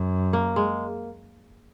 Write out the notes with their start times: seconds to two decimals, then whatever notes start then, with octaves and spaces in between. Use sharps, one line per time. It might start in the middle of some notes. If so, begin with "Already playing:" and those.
Already playing: F#2
0.33 A#3
0.56 G#3